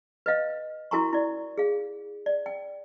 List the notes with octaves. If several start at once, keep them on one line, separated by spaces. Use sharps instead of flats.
B4 D#5 F5
E4 F#4 A#4 G#5 A#5 C#6
E4 D5
G#4 F5
D5
G5